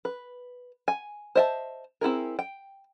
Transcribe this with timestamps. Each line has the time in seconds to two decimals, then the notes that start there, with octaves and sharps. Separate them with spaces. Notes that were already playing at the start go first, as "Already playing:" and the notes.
0.05 B4
0.88 G#5
1.35 C5 D#5 E5 G5 A5
2.01 C4 E4 G#4 A#4
2.39 G5